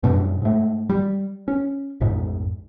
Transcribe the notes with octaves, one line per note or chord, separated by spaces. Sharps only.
F#2 B2 G3 D4
G#2 A3
G3
C#4
A#1 F2 G#2